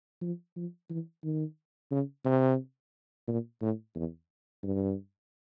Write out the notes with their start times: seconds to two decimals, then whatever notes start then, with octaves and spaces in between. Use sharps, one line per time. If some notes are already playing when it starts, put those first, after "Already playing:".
0.22 F3
0.56 F3
0.90 E3
1.24 D#3
1.91 C#3
2.25 C3
3.27 A#2
3.61 A2
3.95 E2
4.63 G2